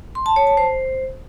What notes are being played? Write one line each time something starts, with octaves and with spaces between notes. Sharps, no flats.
C6
A5
C#5
A5
C5